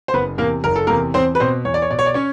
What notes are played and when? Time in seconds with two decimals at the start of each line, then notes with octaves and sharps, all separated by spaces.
0.08 C5
0.14 F#1 B3 B4
0.38 E2 A#3 A#4
0.41 C3
0.63 F#1 A#4
0.76 A4
0.87 E2 C3 A#3 A#4
1.14 E2 C4 C5
1.35 B4
1.40 B2 C4 C5
1.65 E2 C#5
1.74 D5
1.82 C#5
1.90 B2 D5
1.99 C#5
2.06 D5
2.14 C#4 C#5